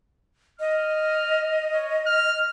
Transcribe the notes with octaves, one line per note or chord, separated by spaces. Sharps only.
D#5 F6
C#5
F6